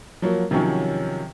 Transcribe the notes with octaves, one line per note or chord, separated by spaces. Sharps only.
F3 F#3 A#3
C3 D#3 F3 F#3 C#4